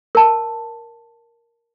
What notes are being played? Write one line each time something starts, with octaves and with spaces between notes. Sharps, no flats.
A#4 A5